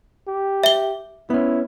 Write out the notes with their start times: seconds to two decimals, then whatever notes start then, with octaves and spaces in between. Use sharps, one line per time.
0.28 G4
0.64 E5 G7
1.30 B3 C#4 E4